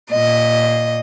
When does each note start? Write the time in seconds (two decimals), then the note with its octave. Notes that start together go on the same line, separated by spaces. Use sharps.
0.10 A#2 D#5